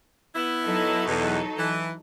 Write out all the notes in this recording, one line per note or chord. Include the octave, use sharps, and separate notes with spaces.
B3 E4
F#3 D#4 A4
E2 B2
E3